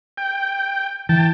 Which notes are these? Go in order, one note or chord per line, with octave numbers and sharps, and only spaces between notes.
G5
E3 G5 A5